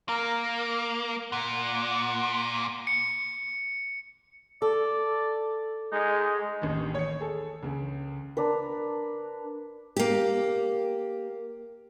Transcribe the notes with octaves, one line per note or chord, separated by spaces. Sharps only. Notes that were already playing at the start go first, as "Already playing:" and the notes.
A#3 A#4
A#2 F#5
C#7
A4 D5
G#3 D#4
A1 D#2
C#5 C#7
G#4 A4
C#2 C#3
D4 A#4 B4
A#3 G4